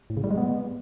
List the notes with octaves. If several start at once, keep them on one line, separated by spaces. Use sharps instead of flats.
A2
C#3
G3
G#3
B3